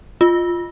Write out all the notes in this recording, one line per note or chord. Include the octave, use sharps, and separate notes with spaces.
F4